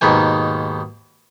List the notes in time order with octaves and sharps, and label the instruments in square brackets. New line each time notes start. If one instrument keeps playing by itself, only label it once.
[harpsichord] D#2 G#2 B2 D#3 G#5